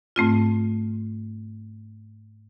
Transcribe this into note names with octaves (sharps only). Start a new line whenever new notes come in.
G#2 A3 C4 F4